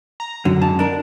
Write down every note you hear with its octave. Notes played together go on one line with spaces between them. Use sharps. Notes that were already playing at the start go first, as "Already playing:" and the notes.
A#5
F#2 D3
G#2 A5
D4 A#4